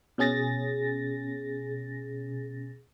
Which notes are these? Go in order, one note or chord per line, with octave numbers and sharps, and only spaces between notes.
B2 C#4 G#4 A6 A#6